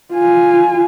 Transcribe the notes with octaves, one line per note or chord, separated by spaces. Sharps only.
F4 G#5